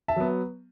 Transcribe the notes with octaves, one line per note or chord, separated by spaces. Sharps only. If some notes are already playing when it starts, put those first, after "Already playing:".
E5 A5
F#3 B3